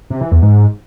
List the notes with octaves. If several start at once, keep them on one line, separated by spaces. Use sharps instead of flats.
C3
E3
E2
G#2